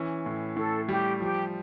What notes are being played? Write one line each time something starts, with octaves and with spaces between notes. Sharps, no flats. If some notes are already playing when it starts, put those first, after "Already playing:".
Already playing: E3 C#4
A2
A2 A4
G3 G4
F3 G4